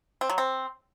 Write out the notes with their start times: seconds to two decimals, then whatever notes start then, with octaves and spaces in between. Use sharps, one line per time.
0.21 C4
0.29 F#3
0.38 C4